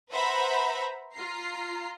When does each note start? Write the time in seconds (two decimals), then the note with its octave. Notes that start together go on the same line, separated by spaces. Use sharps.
0.11 B4 C5 E5 F#5 A#5 B5
1.15 F4 A#5 C7